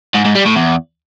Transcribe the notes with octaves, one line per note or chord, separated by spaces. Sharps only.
G#2
G#2
G3
A2
E2